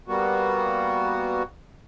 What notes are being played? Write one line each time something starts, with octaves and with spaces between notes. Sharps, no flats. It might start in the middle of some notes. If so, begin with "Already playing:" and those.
G3 A#3 B3 F#4